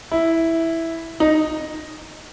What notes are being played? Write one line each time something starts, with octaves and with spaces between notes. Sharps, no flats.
E4
D#4